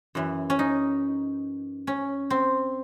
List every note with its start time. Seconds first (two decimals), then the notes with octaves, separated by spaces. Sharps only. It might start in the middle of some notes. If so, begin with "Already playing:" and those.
0.15 F#2 E3
0.50 C#4
0.59 D#4
1.87 C#4
2.30 C4